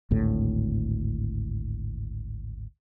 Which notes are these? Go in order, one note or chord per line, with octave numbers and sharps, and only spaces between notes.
G#1 D2 A2